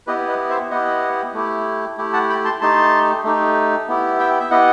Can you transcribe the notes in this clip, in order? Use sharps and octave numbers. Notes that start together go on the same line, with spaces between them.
B3 E4 G4 B4 D#5
B4 D#5
C5 E5
B3 E4 G4 D#5 F#5
A3 E4 G4
A3 E4 G4
F#5 A5
G5 B5
A5 C6
A3 D#4 G4 A5 C6
A3 D#4 G4
B3 E4 G4
E5 G5
E5
B3 E4 G4 D#5 F#5